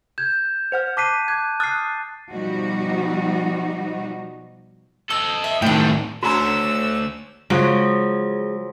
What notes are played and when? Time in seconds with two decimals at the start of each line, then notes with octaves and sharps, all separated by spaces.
0.18 G6 G#6 E7
0.72 C5 F#5 F6
0.97 A5 D6 F#6 B6 C7 D#7
1.28 D6 F#6 G#6
1.60 D#6 F6 F#6 A6 C7
2.31 B2 F3 G3 D#4 F#4
5.10 A4 D#5 E6
5.44 E5
5.62 A2 D#3 E3 C4 D4 G5
6.23 D2 D3 C#4 F#4 A#5 E6
7.50 C#3 F3 F#3 G#3